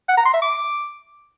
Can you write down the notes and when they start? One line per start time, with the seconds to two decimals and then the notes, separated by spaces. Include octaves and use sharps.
0.09 F#5
0.17 A#5
0.25 C6
0.34 E5
0.42 D6